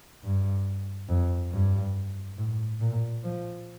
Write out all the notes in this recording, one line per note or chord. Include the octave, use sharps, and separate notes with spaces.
G2
F2
G2
A2
A#2
F3